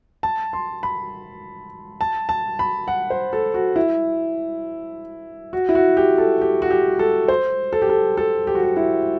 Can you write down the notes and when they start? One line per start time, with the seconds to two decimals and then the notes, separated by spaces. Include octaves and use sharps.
0.23 A5
0.53 C6
0.83 B5
2.01 A5
2.29 A5
2.59 B5
2.88 F#5
3.10 C5
3.33 A4
3.54 F#4
3.76 E4
5.53 F#4
5.69 E4
5.75 F#4
5.97 G4
6.18 A4
6.41 G4
6.62 F#4
6.71 G4
6.99 A4
7.28 C5
7.73 A4
7.82 G4
7.89 A4
8.17 A4
8.47 G4
8.55 F#4
8.63 G4
8.77 E4